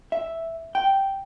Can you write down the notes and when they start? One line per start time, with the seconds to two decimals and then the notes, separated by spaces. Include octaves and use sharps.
0.12 E5
0.75 G5